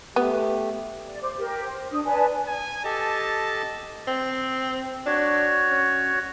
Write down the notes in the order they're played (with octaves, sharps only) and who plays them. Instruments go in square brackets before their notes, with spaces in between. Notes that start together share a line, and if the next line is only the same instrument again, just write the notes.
[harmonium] A3 G4 [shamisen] B3
[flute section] D5
C5 D6
G4 A#4
C5
D4 D#6
B4 D5 G#5 A5
[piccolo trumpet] G#5
[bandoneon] G4 A4 D#5 [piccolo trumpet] A5
[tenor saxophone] C4
[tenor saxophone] D4 [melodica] F#4 C#5
[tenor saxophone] C#4